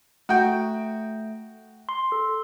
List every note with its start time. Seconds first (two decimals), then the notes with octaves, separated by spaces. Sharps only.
0.29 A3 F#4 G5
1.89 C6
2.12 A4